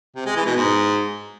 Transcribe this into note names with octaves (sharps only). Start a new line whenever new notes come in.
C3
G#3
E3
B2
G#2